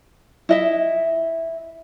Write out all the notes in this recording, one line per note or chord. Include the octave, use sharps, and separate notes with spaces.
E4 D#5 E5